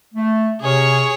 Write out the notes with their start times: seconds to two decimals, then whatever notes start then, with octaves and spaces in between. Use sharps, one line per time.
0.14 A3
0.61 C3 C#4 G#4 C#5